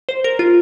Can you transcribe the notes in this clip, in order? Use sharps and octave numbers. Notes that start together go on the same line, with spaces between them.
C5
A#4
F4